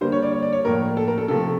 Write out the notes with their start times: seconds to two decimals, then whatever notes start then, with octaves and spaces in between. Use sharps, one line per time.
0.01 D3 G3 A#3 C5
0.12 C#5
0.22 D5
0.33 C#5
0.43 D5
0.53 C#5
0.65 A2 F3 A#3 A#4
0.97 A4
1.08 A#4
1.18 A4
1.28 C3 F3 A3 A4